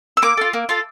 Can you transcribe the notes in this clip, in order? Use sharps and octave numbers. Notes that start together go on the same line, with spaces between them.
E6
A#3 D6
F4 A4
A#3
F4 A4